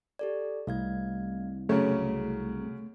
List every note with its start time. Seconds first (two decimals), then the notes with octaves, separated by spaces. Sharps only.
0.19 G4 A4 D5
0.67 C2 A3 F5 G#6
1.69 F#2 C#3 A3 C#4 G#4 A#5